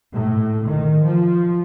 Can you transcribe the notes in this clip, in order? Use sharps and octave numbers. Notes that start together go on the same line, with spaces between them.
A2
D#3
F3